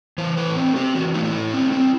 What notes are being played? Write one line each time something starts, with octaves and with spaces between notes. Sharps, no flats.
E3 C5
A3 B4
C4
C4 G4
E3 F#4
A3 D#4
E4
A3
C4
C4